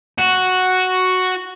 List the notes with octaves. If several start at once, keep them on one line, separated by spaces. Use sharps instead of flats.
F#4